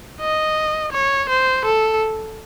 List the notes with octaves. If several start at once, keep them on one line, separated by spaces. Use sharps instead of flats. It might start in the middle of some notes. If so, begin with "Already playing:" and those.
D#5
C#5
C5
A4